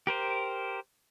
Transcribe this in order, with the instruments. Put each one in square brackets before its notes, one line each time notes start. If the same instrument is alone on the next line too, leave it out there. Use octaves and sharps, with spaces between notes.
[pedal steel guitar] G4 A#4 C5